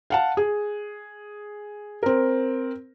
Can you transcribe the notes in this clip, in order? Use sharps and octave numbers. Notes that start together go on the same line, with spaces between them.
F5 F#5 A5
G#4
C4 A#4